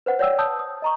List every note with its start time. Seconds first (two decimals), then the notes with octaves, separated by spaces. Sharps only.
0.06 B4 C5 F#5
0.19 C#5 D5 F#5 G5 E6
0.39 A5 D#6 E6 G6
0.59 D#6
0.82 D#5 A#5 C#6